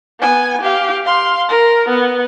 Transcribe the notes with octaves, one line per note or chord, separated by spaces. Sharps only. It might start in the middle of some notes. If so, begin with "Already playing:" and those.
B3 G#5
G4 F5
F5 C6
A#4
B3